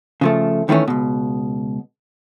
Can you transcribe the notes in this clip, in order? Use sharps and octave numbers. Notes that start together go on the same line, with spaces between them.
C#3 F3 A3
D#3 E3 A3 C#4
C#2 B2